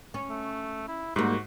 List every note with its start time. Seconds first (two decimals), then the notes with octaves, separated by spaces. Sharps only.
0.14 C#4
0.30 A3
0.88 E4
1.16 G#2 G3 A#3 F#4